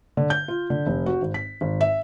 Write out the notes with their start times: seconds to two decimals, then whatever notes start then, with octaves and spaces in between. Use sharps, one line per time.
0.17 D3
0.30 G6
0.48 F4
0.70 D3
0.86 F1
1.06 F#4
1.22 G#1
1.34 B6
1.61 G#1
1.81 E5